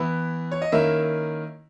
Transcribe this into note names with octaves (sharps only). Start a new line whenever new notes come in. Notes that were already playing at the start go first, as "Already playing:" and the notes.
Already playing: E3 B3 E4
C#5
D#5
D#3 A#3 C#4 E4 E5